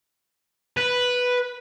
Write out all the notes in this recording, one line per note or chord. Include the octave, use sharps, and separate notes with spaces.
B4